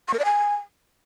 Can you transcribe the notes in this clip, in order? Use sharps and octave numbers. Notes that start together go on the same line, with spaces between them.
C#6
A#4
D5
G#5